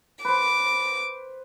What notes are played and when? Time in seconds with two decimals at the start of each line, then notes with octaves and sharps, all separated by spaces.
0.25 B4 C5 D6